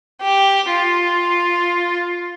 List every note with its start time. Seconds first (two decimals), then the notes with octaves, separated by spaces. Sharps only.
0.22 G4
0.69 F4